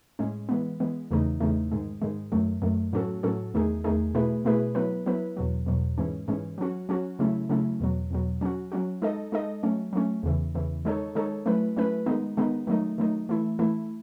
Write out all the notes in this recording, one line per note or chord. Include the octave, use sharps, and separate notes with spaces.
A2 G#3 C#4
E3 G#3 B3
E3 G#3 B3
E2 C#3 E3 A3 D#4
E2 C#3 E3 A3 D#4
G#2 D#3 G#3
G#2 D#3 G#3
F#2 D#3 F#3 A3
F#2 D#3 F#3 A3
A2 F#3 C#4 F#4 A4
A2 F#3 C#4 F#4 A4
E2 D#3 A3 D#4 G#4
E2 D#3 A3 D#4 G#4
B2 A3 E4 G#4 B4
B2 A3 E4 G#4 B4
F#3 B3 E4 B4
F#3 B3 E4 B4
E2 B2 F#3
E2 B2 F#3
G#2 E3 G#3 C#4
G#2 E3 G#3 C#4
F#3 C#4 F#4
F#3 C#4 F#4
C#3 F#3 A3 C#4 E4
C#3 F#3 A3 C#4 E4
E2 B2 F#3
E2 B2 F#3
F#3 C#4 F#4
F#3 C#4 F#4
G#3 D#4 A4 D#5
G#3 D#4 A4 D#5
F#3 A3 C#4
F#3 A3 C#4
E2 C#3 E3
E2 C#3 E3
D#3 G#3 D#4 A4 C#5
D#3 G#3 D#4 A4 C#5
F#3 A3 C#4 E4 B4
F#3 A3 C#4 E4 B4
D#3 G#3 B3 D#4
D#3 G#3 B3 D#4
D#3 F#3 A3 D#4
D#3 F#3 A3 D#4
E3 A3 E4
E3 A3 E4